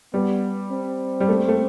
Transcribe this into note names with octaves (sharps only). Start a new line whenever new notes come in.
G3 B3
C4
G3
A3
A3